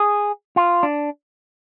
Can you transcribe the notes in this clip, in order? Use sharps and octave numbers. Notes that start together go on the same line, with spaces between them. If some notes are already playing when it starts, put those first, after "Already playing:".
Already playing: G#4
F4
D4